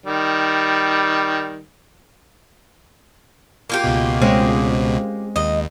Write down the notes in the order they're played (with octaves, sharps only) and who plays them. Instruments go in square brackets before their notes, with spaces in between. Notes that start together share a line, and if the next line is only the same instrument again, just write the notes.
[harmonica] D#3 G3
[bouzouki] A#3 F4 G4
[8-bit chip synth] C#2 B2
[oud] G#3 C4 C#4
[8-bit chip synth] D#2 [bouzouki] D#5